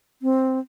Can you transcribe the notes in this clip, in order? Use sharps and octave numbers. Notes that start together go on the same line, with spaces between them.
C4